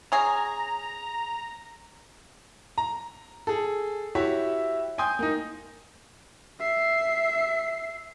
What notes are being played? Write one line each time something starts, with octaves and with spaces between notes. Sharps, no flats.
C#4 G#4 A#5
A#5
G#4 A4
E4 F#4 G4 C#5 E5
G5 G#5 C6 D#6 G6
A#3 D#4
E5 C7